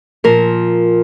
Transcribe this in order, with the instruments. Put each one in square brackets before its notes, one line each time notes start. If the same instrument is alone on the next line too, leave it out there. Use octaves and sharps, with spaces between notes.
[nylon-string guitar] A#2 F3 A#4